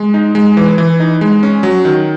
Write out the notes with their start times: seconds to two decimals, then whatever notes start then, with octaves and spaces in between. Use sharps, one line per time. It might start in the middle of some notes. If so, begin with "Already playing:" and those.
Already playing: G#3
0.14 D#4
0.35 G#3
0.57 E3
0.78 E3
1.00 D#4
1.21 G#3
1.43 C#4
1.63 F#3
1.85 D#3